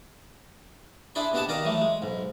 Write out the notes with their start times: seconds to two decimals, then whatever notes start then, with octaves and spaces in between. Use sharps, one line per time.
1.15 D4 E4 G#4 D5 B5 C6
1.33 B2 B3 G4 G#4 F#5 A5
1.48 D#3 D#4 D5 D#5 F5 D6
1.65 E3 F#3 A3
1.81 G#3
2.02 B1 G#2